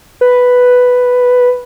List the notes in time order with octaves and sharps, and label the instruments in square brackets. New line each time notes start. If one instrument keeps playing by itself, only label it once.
[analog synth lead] B4